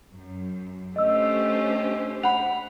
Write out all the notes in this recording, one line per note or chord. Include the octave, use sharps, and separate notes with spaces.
F#2
A3 C#4 D4 G4 C5 D#5 E6
F#5 B5 F7